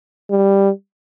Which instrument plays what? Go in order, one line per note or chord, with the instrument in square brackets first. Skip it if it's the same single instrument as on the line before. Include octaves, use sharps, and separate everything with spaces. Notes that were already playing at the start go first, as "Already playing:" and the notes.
[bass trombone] G3